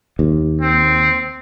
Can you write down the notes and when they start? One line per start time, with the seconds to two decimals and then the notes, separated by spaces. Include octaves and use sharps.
0.19 D#2
0.61 C4